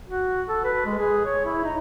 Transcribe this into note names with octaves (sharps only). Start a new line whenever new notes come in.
F#4
A4
B4
G#3
G#4
C#5
E4
D#4